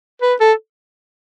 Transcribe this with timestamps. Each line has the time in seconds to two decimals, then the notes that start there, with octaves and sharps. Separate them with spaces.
0.22 B4
0.40 A4